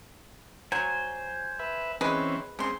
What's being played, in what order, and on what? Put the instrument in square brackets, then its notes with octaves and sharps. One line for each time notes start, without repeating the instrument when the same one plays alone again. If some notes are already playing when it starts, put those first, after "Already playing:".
[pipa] F#3 [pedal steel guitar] C5 G#5
[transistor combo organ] B4 E5
[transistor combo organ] E3 C4 C#4 [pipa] G#3 G#4 B4
[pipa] C#3 C6 [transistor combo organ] G#3 C4